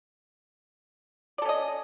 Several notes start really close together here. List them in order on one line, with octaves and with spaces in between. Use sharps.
D5 A4 C#4 D#5